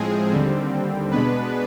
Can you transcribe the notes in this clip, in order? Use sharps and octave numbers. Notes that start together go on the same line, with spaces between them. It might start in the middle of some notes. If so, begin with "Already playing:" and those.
Already playing: A2 F3 G#3 C4 G#4
D#2 D3 G3 C4
B2 G#3 B3 D4 B4